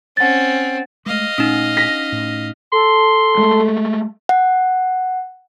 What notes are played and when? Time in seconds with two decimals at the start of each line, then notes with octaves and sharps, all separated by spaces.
0.17 C4 C#4 F#5 A6
1.06 G#3 A3 D#5 F5
1.38 A#2 A3 C#4 D#4
1.77 A#6 B6
2.12 A2
2.72 A4 C6
3.37 G#3 A3
4.29 F#5